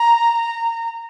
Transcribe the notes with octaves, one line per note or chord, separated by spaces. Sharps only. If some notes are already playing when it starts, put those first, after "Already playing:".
Already playing: A#5